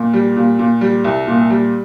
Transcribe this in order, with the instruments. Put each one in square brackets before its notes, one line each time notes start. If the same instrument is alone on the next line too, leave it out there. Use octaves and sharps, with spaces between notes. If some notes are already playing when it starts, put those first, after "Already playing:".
Already playing: [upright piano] A#2
G3
A#2
A#2
G3
C2
A#2
G3